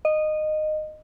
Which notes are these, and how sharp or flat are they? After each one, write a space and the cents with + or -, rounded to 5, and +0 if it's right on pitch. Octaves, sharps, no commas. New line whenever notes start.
D#5 -15